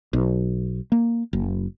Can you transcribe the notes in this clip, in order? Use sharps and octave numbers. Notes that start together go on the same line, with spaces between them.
B1
A#3
F#1